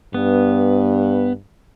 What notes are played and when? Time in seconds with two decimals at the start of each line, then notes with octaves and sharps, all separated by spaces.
0.14 G2 B3